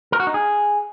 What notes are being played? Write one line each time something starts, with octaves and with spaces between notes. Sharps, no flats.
A#4
F#4
D#4
G#4